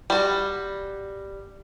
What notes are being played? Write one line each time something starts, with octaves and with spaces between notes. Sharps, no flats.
G3 F#4